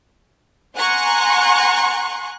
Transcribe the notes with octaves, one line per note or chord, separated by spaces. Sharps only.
F#5 G#5 A#5 C6 C#6 F#6